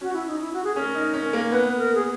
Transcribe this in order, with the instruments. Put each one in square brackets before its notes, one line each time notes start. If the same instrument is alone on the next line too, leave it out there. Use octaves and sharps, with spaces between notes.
[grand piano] C#4 [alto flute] F#4
[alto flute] E4
D#4
E4
F#4
G#4
[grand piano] C#4 [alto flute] A#4
[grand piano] D#4
C#4
A#3
[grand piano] B3 [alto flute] B4
[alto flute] A#4
G#4